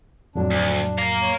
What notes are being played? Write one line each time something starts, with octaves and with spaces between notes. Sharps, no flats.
F2 A2 F#3 D4
D2
F5 A#5
C#5